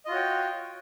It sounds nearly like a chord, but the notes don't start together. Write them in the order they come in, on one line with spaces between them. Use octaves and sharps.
D#5 F4 F#4 C#5 G5